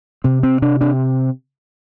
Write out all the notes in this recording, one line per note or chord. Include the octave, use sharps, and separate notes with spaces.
C3 C4
C3 C4
C3 D4
C3 D4